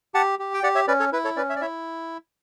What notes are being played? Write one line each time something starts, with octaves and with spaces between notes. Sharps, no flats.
G4 F#5 A5
G4
G5
G4 D5 F#5
C#5 E5
C#4 B4 D5
A4 C#5
E4 B4
A4 C#5
C#4 B4 D5
C#5 E5
D5
E4 C#5 E5